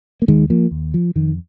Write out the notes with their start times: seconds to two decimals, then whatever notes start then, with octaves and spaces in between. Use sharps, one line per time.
0.22 A#3
0.28 D#2 D#3 G#3
0.50 F3 A#3
0.71 D#2
0.94 F3
1.15 F2 D#3